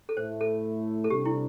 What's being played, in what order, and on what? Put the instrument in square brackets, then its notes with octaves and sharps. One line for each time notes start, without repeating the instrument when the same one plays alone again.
[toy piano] A4
[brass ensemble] A2 A3 E4 [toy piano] C5
[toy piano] A4
A4
[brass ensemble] C3 G3 D4 [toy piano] G4
[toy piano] E4